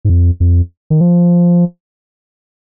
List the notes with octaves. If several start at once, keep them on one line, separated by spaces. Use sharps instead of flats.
G#2
F2
F2
D#3
F3